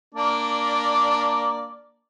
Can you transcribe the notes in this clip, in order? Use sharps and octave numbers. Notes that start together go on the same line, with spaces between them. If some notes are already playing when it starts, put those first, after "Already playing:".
A#3 D4 D5